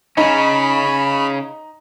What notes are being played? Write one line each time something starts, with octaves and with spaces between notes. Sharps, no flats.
C#3 C#4 D#4 B5